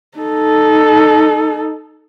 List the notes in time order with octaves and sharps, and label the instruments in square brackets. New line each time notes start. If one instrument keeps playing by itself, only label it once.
[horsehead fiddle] D#4 A4